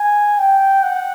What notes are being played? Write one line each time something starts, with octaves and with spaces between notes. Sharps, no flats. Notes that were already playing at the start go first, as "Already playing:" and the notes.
Already playing: G#5
G5
F#5